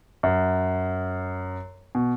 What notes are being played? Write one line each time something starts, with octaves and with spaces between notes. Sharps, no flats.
F#2
B2